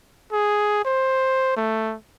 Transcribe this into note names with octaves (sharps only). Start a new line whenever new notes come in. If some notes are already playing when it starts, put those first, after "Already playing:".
G#4
C5
A3